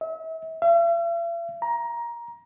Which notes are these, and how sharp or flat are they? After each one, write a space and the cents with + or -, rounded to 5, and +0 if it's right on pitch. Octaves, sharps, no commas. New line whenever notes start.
E5 -40
E5 +45
A#5 +15